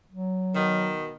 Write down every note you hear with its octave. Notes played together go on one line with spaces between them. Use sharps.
F#3
B2 D#3